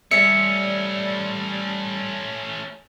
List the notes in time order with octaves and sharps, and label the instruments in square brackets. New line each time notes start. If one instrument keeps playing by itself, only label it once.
[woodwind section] G3 [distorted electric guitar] A3 C#4 [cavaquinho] E5 [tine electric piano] C#7